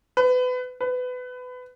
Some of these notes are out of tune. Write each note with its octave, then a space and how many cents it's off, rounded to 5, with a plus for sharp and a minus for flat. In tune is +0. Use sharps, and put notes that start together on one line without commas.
B4 +30
B4 +25